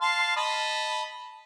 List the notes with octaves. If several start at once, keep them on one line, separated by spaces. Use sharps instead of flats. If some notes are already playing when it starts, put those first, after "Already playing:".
F5 A5 C6
D#5 A5 B5